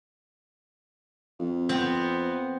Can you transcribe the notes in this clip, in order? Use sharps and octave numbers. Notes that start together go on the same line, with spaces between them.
F2
B3 C4